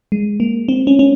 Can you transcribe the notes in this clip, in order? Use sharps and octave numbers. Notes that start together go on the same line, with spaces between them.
G#3
A#3
C4
C#4
C#4